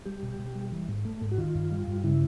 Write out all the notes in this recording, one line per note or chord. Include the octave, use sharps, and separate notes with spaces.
G3 G4
B2
B2
G3
E3
G#2
A3
G#2
F#4
D#3 F4
G2
G3
G2
C#3 E4